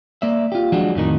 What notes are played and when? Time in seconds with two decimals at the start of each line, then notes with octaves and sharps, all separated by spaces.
0.22 A#3 D5 E5
0.52 F4 G4
0.72 F3 F#3 G#3 D4 F#4
0.95 F2 A2 D#3 D#4